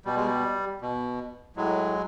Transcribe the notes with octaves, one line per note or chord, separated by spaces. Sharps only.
B2 G3
G#3
G3
B2
A2 F#3 G#3